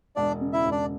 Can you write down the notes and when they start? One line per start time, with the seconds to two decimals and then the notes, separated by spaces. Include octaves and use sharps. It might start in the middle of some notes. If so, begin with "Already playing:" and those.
0.16 E1 D4 D5
0.41 C#3
0.53 E4 E5
0.66 E1
0.71 D4 D5